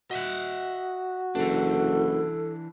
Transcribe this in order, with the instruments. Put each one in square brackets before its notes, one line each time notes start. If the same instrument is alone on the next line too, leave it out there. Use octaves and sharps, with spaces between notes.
[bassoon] F#4 [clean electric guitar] D#5 E5 F#5
[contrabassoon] F#1 [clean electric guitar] E3 D4 [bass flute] A4